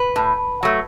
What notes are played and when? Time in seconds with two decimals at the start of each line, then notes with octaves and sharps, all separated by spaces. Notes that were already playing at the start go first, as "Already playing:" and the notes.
Already playing: B4
0.16 A2
0.63 F#3 A3